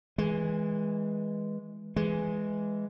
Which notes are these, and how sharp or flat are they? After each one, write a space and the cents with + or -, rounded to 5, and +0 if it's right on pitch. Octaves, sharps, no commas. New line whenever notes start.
E3 -20 G#3 +0
E3 +10 G#3 +0